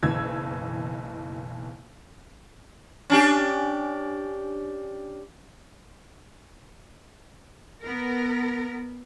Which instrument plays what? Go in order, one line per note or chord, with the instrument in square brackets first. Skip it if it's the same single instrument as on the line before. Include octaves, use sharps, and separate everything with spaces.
[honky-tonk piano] F#1 B1 E3 E6 G#6
[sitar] C#4 D4 G4
[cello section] B3 A#4